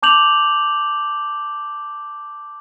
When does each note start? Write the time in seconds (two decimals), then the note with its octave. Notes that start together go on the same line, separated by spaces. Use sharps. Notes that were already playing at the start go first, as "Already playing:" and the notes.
0.03 A5 D6 G6 F7 F#7